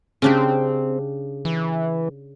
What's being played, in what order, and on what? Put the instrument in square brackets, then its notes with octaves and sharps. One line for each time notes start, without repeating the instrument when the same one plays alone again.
[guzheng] C#3 D4 G4 [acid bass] C4
[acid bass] E3